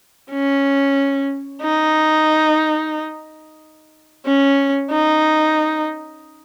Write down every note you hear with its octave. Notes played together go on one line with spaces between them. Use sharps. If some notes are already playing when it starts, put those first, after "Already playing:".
C#4
D#4
C#4
D#4